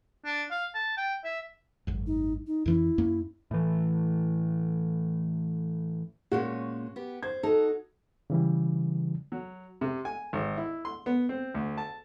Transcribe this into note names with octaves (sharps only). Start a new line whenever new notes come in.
D4
F5
A5
G5
E5
G#1 F#2
D#4
D#4
F2 E3 C#4 E4
F#2 A#3 C#4
A2 E3
A#2 G#3 C#4 F#4
B3 G4
C5 G#6
D#4 F#4 A4
C#3 E3 G3
F#3
C3
G#5
G#1
E4
C6
B3
C4
D2
A5